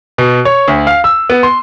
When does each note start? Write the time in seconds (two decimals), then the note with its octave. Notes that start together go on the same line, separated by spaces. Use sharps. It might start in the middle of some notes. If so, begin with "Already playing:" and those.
0.18 B2
0.45 C#5
0.68 D2
0.87 F5
1.04 E6
1.30 B3
1.43 C6